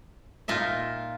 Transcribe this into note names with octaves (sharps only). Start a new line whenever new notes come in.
A#2 D#4 F4 A#4 E5